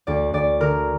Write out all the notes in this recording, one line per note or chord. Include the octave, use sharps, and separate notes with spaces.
D2 D5
D2 D5
D3 A#4